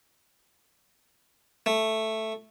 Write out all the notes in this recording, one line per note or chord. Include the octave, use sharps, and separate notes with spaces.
A3